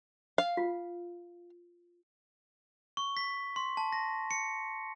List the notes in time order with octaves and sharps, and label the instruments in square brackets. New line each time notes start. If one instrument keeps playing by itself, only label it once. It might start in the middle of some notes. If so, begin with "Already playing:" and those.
[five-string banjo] F5
[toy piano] F4
[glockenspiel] C#6
B6
C6
A5
A#6
C#7